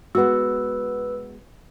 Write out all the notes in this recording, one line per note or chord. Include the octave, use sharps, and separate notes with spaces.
G#3 B3 F#4 B4 E6